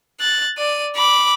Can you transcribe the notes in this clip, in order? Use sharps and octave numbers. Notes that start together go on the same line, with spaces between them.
F#6 A6
D5 D#7
B5 D6